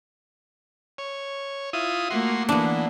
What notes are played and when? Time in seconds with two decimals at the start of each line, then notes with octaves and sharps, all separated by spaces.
0.98 C#5
1.73 E4 F4 D#6
2.10 A3 A#3 F#4 C6
2.49 E3 A#3 B3 D4